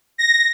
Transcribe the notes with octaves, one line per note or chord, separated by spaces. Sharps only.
A#6